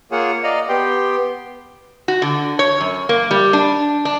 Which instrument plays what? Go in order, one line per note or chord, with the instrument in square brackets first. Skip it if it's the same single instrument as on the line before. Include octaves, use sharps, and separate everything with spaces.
[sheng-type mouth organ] A#3 F4 G#4 C#5 F#5
D5 D#5 F5 A#5
B3 G4 G5 C6
[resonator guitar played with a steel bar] F#4
D3
C#5
F#2
A#3
G3
D4
D4